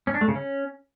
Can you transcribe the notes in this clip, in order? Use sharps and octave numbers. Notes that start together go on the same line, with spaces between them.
C#4
D4
A3
C#3
C#4